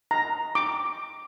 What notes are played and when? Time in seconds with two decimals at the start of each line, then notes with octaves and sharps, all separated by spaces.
0.11 A#5
0.55 D6